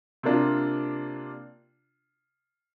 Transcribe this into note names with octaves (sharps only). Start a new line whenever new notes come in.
C3 A#3 D4 F4